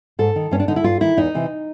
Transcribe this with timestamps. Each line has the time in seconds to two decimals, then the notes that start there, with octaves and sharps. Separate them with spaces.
0.19 G#2 A4
0.36 D#3
0.51 G2 C#4
0.60 D4
0.68 D3 D#4
0.76 E4
0.84 G2 F4
1.00 D#3 E4
1.17 E2 D#4
1.35 C3 E3